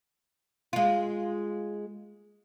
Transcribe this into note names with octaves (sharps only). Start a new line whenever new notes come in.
G#3 F4